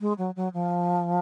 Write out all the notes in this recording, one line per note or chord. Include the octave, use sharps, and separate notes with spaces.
G#3
F#3
F#3
F3